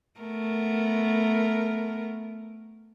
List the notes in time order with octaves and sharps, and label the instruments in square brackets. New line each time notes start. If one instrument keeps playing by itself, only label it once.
[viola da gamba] A3 B3 A#4